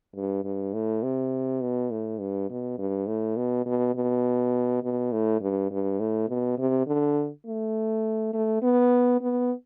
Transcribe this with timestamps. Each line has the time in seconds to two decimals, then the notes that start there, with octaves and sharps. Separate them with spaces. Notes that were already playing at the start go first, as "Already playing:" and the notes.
0.16 G2
0.44 G2
0.74 A2
1.03 C3
1.62 B2
1.91 A2
2.20 G2
2.50 B2
2.78 G2
3.07 A2
3.37 B2
3.66 B2
3.95 B2
4.83 B2
5.12 A2
5.41 G2
5.71 G2
6.00 A2
6.29 B2
6.58 C3
6.87 D3
7.46 A3
8.33 A3
8.62 B3
9.21 B3